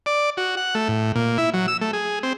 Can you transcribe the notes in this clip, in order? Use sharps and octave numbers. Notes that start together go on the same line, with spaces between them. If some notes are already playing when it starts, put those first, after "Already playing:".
D5
F#4
F#5
A3
A2
A#2
E4
F#3
E6
A3
G#4
C4